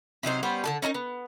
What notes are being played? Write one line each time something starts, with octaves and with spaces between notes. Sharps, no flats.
C3 F#3 D#4 C5
G3 B3 C#4 C5
D3 G4 A5
C#4 D#4 A4 A#4
B3